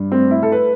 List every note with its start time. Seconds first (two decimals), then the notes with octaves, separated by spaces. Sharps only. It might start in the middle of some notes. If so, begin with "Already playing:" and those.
Already playing: G2
0.12 A3 C4
0.31 E4
0.43 A4
0.52 B4